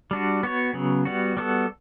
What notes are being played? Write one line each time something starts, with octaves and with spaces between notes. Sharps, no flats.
G3 D4 F#4
B3 F#4 C#5
C#3 F#3 B3
G3 B3 F#4
G3 B3 F#4 A4